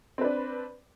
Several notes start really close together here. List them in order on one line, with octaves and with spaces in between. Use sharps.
C4 B4 D4